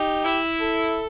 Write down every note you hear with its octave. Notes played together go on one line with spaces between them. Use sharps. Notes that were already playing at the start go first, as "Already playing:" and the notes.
Already playing: D#4 G4
E4
A4